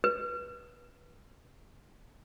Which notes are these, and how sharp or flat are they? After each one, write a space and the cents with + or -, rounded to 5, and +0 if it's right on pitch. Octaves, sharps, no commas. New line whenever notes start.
B4 -35